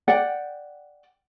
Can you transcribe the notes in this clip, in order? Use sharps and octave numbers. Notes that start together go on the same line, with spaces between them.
D5 F#5 G5